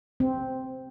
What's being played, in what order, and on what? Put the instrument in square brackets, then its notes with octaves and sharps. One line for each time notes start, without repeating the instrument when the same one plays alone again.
[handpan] C4